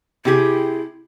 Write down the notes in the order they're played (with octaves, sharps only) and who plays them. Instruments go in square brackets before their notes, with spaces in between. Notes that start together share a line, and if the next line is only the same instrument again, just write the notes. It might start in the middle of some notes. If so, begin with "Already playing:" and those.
[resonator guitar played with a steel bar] C3 G4 G#4 [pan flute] E4